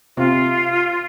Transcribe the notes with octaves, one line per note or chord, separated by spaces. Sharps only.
C3 F4